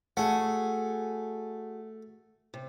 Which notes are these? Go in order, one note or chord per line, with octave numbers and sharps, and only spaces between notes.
A3 F#4 G#4 F#5
C3